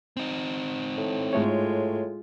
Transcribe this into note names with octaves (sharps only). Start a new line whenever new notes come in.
C4 D#4
A2
G#2 G#3 A3 F4 C#5